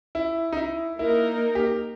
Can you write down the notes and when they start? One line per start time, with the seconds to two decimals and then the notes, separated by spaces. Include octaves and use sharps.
0.15 E4
0.52 D#4
0.57 E4
0.98 A#3 D#4 E4 A#4
1.55 G4